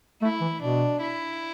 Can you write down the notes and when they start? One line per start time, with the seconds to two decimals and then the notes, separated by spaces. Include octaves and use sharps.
0.22 A3 E4
0.41 E3
0.61 B2 D4
1.00 E4